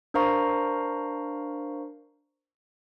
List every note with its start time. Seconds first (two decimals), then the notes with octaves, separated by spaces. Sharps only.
0.14 D4 A#4 C5 F5 A#5 C#6